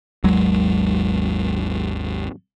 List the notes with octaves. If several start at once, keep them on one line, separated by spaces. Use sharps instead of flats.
G#1 D#2 F#3 G#3